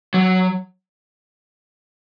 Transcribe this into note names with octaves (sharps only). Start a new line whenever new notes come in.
F#3